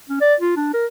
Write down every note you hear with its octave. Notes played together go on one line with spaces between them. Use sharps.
C#4
D5
F4
D4
A#4